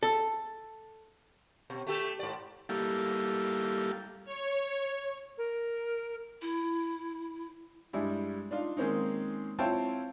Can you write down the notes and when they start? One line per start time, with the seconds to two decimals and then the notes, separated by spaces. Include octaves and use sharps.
0.03 A4
1.70 B2
1.87 A3 G4 A4
2.19 G#2 D5
2.69 G3 A#3 E4 G4 A4 F5
4.25 C#5
5.38 A#4
6.42 E4
7.93 G2 G3 G#3 E4
8.51 D4 D#4 F4
8.77 D#3 G#3 A#3 C4 C#4 D#4
9.59 C4 E4 F4 C#5 G5 A5